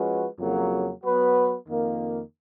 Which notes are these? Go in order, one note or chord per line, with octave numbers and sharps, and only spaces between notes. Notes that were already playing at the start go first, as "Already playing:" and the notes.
Already playing: F3 G#3 C#4 F#4 B4
F2 C#3 F#3 A#3
F#3 B3 F#4 B4
F2 D#3 A#3